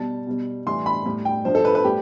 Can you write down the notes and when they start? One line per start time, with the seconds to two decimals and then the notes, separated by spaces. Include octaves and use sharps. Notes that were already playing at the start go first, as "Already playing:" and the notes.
Already playing: B2 G3 A5
0.27 B2 G3
0.66 A2 E3 G3 C6
0.86 B5
1.05 A2 G3
1.25 G5
1.45 G2 F3 C5
1.55 A4
1.65 B4
1.75 B4
1.84 A2 G3 G4